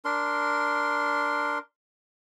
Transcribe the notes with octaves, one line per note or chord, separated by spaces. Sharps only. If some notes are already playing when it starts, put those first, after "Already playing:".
D4 A#4 C6